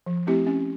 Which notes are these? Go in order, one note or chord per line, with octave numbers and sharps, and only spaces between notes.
F3
A3 C4 E4 G4
C#4